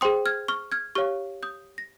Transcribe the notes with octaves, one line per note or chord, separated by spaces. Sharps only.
G#4 C5 G5 C6 D#6
F6 G#6
C#6 F6
F6 G#6
G4 C#5 F5 C#6 F6
D#6 G6
A#6